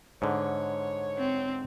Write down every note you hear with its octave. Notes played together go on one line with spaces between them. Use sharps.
G#2 D3 C#5
C4